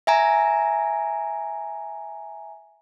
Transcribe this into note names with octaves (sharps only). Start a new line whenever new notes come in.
E5 G#5 A#5